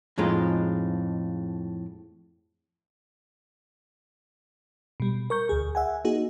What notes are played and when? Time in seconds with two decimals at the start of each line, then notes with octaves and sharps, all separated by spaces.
0.18 F2 A2 G#3 D#4 F4
5.00 B2 G3
5.30 A#4 C#6 G6
5.49 D2 G#4
5.75 E5 F#5 G#5
6.05 A#3 D#4 F#4 G#4